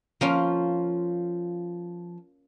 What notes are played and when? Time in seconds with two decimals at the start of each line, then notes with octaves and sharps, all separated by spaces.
0.21 F3 A#3 C#4 F4